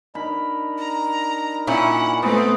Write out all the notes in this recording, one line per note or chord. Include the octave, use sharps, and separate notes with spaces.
D4 D#4 A#4 B5
A#5
A#2 C#4 E4 F#5
A3 B3 C4